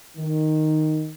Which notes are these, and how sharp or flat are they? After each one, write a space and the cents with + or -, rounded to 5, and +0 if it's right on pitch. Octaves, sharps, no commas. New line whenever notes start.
D#3 -5